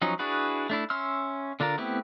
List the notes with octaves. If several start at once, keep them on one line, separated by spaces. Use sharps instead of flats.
F3 F#3 C#4 D#4
D4 E4 F#4 G#4 B4
A3 D4 E4
C#4 E5 C6 E6 F6
D3 D4 F4 A#4
A3 B3 C4 E4 G4